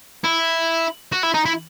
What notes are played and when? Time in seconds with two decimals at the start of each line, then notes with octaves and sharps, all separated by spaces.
0.24 E4
1.12 F#4
1.23 E4
1.34 D#4
1.46 E4